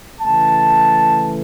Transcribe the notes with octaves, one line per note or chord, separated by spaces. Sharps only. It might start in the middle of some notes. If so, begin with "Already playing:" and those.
C#3 E3 A3 A5